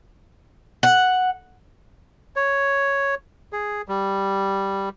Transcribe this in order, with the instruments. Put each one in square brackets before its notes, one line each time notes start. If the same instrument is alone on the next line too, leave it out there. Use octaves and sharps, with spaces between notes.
[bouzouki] F#5
[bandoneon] C#5
G#4
G3